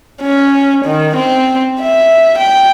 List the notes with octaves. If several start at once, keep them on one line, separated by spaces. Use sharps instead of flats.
C#4
D#3
C4
E5
G5